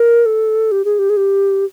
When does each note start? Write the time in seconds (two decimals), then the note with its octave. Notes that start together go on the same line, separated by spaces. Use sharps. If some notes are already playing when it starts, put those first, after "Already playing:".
Already playing: A#4
0.26 A4
0.72 G4
0.85 G#4
0.99 G4
1.10 G#4
1.17 G4